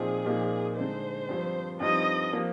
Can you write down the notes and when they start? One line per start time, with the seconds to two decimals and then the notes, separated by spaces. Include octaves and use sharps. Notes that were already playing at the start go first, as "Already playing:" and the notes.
Already playing: A#2 F3 C4 D#4 G#4
0.26 A#2 F3 A#3 D#4
0.76 D3 G#3 D#4 C5
1.29 G2 F3 C4
1.80 G2 F3 C4 D#4 D#5
2.32 F3 A#3